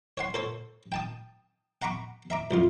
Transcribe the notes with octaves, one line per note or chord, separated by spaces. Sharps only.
C#5 F#5 C6
A4 C5 C#5
G5 A5 D#6
F#5 A#5 B5 C#6 D6
E5 A#5 D6
C2 F2 F4